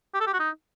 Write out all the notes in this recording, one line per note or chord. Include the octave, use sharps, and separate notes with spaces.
G4
A4
G4
F#4
D#4